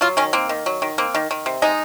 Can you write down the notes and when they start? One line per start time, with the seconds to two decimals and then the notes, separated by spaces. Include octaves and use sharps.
0.01 F#3 F4
0.17 D#3 C#4
0.33 A#3 C4
0.49 D#3
0.66 F#3
0.82 D#3
0.98 A#3 C4
1.15 D#3
1.31 D#3
1.46 C3
1.62 G#3 D#4